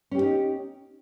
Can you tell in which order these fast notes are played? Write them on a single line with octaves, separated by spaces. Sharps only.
C#4 G4 B3 D#4